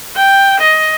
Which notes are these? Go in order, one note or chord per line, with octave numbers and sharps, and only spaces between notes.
G5
D#5